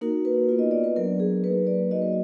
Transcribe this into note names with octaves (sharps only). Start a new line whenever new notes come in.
A#3 D#4 F#4 A#4
B4
B3 F4
D#5
D5
B4
F#3 B3 D4 A#4
G#4
F#3 A#3 D#4 B4
D5
F#3 A#3 D#4 F#4 D#5
B4